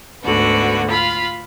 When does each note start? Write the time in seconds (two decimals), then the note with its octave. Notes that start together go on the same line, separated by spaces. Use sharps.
0.23 D2 G#2 D3 B3 F#4
0.89 F4 F5 B5